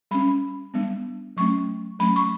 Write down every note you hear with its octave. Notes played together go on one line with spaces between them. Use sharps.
G3 C#4 B5
G3 B3 D4
F#3 A3 C#4 C#6
F#3 A3 C#4 B5
C#6